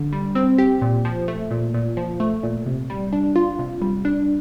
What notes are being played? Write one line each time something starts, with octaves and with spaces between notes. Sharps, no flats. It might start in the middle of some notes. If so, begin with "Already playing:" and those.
Already playing: D3
G3
C4
G4
A#2
F3
A3
A#2
A#2
F3
A3
A#2
C3
G3
D4
F4
C3
G3
D4